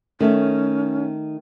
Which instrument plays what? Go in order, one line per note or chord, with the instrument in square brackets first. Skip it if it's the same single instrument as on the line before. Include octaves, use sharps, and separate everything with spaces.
[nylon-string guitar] D#3 A3 [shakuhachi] C#4